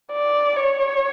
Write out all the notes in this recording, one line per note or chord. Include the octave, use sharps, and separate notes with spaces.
D5
C#5